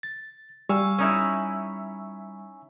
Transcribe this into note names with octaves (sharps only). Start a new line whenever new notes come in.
A6
G3 F5 G#5 C#6 E6
C#4 D#4 E4